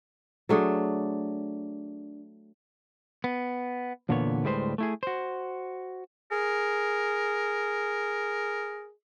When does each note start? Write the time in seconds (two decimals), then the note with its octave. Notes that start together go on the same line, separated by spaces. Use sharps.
0.49 F#3 A3 D4 G#4
3.24 B3
4.09 E2 A#2 D3 A#3 B3 C#5
4.43 D2 A2 G3 G#3 B4 C5
4.78 A3 E4 G#4
5.03 F#4 C5
6.32 G#4 A#4